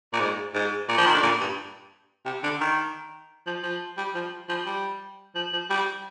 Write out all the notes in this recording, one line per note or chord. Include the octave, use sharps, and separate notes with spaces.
A#2
G#2
G#2
A#2
F3
D#3
D3
A#2
G2
C3
D3
D#3
F3
F3
G3
F3
F3
G3
F3
F3
G3